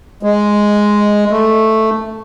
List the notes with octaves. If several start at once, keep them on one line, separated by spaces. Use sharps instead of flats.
G#3
A3